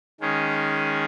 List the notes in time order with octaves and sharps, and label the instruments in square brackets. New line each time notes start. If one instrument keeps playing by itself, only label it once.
[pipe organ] D#3 G#3 C#4 G#4